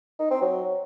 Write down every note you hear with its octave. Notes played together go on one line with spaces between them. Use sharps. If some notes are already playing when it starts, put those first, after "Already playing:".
D#4
C4
F#3